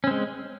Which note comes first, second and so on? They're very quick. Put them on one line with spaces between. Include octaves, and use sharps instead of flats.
C#4 C4 G#3